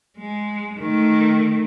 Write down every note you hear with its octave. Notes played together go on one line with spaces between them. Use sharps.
G#3
D#3 A3